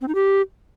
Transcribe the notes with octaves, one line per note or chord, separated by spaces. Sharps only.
C4
D#4
G4